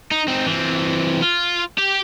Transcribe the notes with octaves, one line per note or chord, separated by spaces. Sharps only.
D#4
C4 D#4
E3 C4
F4
G4